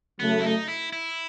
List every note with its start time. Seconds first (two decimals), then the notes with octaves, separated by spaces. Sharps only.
0.19 C#3 F#3 A3 B3
0.40 E4
0.44 D#4
0.68 E4
0.93 E4